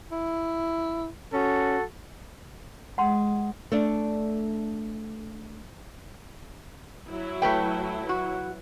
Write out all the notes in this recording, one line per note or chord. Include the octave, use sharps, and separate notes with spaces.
E4
C#4 F#4 A4
G#3 F#5 C6
A3 D4
F#3 E4
A3 B4 G5
F#4